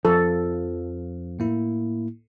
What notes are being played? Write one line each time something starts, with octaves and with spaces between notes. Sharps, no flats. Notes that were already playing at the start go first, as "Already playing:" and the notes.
F2 F3 A4
A2 A#3 E4